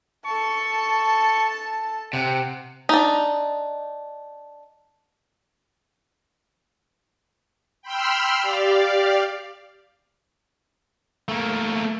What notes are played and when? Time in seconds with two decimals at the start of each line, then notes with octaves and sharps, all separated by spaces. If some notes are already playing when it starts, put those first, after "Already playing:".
0.25 A4 A5 C#6
2.13 C3 F#5
2.89 D4 D#4
7.82 G5 B5 C6 E6 F6
8.41 G4 D5 F5
11.28 A3 A#3